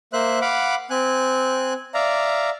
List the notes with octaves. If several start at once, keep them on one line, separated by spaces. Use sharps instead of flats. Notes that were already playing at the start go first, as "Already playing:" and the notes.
A#3 C5 E5 F#6
F5 F#5 B5 D6
C4 G#5 F#6
D5 E5 F5 A#5